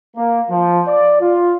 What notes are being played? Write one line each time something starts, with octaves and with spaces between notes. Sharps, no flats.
A#3
F3
D5
F4